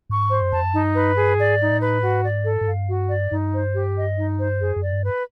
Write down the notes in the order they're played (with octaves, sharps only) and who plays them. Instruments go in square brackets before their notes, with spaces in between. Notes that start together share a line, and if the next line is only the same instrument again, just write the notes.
[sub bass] G#2 [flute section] C#6
[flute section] C5
[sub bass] F#2
[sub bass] F2 [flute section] A5
[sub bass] F#2
[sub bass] G2 [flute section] D#4
[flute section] B4
G#4
[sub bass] G#2 [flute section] D5
[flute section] D#4
[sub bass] A2
[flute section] B4
[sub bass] G#2 [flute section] F#4
[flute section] D5
A4
[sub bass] G#2
[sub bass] G2 [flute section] F5
[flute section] F#4
D5
[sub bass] G2 [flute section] D#4
[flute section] C5
G4
D#5
D#4
C5
[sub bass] F#2 [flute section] G#4
[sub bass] F#2
[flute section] D5
[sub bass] G2
[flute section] B4